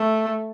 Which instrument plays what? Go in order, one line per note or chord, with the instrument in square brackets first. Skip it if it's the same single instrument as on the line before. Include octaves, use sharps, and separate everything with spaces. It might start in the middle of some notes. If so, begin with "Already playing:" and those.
Already playing: [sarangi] A3